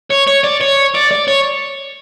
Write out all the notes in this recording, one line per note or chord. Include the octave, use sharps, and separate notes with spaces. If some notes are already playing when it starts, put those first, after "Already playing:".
C#5
C#5
D5
C#5
D5
D5
C#5